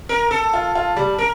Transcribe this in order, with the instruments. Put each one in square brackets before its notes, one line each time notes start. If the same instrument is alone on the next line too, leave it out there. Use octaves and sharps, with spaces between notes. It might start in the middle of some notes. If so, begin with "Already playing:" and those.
[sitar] A#4
A4
[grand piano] F4
F4
G3
[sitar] A#4